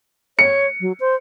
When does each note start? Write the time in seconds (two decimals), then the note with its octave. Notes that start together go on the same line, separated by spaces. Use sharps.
0.39 C#5 C#7
0.81 F#3
1.00 C5